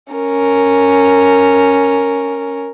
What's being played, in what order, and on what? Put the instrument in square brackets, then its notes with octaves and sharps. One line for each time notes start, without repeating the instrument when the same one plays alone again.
[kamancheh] C#4 A#4